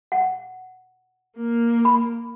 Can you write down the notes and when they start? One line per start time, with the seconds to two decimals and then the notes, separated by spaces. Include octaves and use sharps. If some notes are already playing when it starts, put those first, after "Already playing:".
0.12 F#5
1.39 A#3
1.85 B5